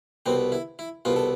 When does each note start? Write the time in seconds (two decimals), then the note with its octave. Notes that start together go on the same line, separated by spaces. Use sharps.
0.26 C2 B2 B3 C4
0.52 E4
0.79 E4
1.05 C2 B2 B3 F4
1.16 A4